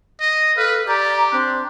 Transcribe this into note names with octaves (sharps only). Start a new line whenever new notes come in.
D#5
A4 B4 F5
G4 D5 A#5
C4 D4